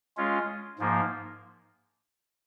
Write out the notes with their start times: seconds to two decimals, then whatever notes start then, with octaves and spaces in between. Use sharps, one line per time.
0.17 G#3 C#4 F4
0.79 G#2 F3 A#3